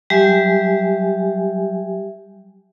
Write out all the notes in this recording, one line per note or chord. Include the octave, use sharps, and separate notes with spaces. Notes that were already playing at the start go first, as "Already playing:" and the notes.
F#3 G3 G4 E5 G#5